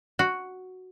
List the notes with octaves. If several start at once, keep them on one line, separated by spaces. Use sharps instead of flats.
F#4